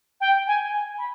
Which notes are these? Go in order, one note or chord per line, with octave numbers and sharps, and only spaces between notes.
G5
G#5
G#5
B5